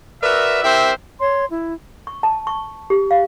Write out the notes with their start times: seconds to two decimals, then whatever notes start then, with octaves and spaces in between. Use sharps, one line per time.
0.23 F#4 A#4 B4 D5 E5
0.64 C4 E4 G4 A#4 C5 E5
1.20 C#5 C6
1.50 E4
2.07 C#6
2.23 A5
2.47 C#6
2.90 G4
3.11 F5